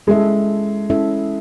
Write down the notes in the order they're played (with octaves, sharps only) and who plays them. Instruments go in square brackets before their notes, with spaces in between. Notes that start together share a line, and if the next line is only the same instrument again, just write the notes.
[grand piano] G#3 [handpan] C#4 E4 A4 E5
[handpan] C#4 E4 A4 E5